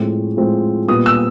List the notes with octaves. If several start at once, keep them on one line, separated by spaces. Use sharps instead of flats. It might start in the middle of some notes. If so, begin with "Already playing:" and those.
Already playing: A2 F3 G#3 C4
A2 F3 G#3 C4
A#2 G3 B3 D#6
E6